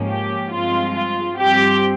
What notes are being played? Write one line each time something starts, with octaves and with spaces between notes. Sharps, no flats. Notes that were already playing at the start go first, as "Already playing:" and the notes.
Already playing: G#2 F3 A#3 C#4
G4
G2 F3 G#3 C4 F4
F4
G2 F3 C4 G4